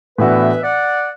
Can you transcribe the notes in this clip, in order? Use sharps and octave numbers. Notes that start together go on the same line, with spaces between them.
A2 E3 B3 D4 F#4 B4 E5
D5 F#5